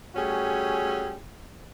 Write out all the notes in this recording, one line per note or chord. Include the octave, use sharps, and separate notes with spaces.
G3 A3 C#4 F#4 G#4